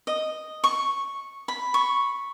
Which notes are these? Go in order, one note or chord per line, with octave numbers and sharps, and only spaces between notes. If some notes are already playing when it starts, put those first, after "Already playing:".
D#5
C#6
B5
C#6